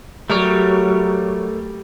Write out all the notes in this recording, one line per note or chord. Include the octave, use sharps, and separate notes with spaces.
F#3 G3 A3 A#4 C#5